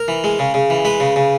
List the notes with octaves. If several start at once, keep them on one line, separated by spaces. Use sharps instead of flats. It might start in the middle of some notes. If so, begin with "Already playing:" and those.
Already playing: A#4
E3
G#3
C#3
C#3
E3
G#3 B4
C#3
C#3